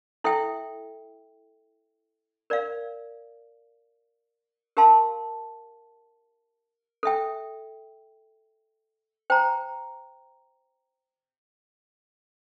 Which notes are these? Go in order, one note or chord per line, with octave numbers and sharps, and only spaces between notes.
E4 A4 E5 G5
A#4 D5 F5
G4 A#4 F5 A5 C6
A4 E5 G5
C5 G5 A#5